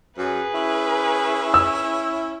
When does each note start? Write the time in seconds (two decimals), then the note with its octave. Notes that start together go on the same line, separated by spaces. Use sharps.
0.18 F#2 G#4 B4
0.54 C#4 E4
1.54 E6